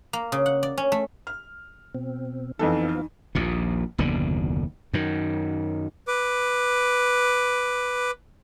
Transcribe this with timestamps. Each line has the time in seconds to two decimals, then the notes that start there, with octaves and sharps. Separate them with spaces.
0.13 A#3
0.32 C#3
0.46 F#5
0.63 D5
0.78 C#4
0.92 A3
1.27 F6
1.95 B2 C4
2.59 F2 E3 F3 B3 D#4 A4 F5
3.35 A#1 D#2 A#2
3.98 F#1 D#2 B2 D3
4.93 F#2 D#3
6.08 B4 D6